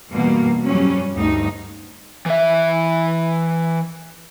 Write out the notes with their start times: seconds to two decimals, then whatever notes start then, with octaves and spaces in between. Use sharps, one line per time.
0.11 E2 G2 B2 A#3
0.64 F2 F#3 G3 C#4
1.14 D2 G2 D#4
2.26 E3 E5